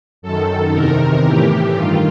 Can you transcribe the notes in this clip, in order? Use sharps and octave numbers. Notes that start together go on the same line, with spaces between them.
F#2 D#3 A4
E2 C3 D#3 A#4
A2 E3 G4
G2 D#3 F4